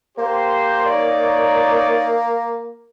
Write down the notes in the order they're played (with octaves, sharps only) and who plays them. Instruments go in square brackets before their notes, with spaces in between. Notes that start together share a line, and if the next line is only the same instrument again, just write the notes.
[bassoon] A#3 [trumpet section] G4 C5
[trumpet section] D#4 C#5 D5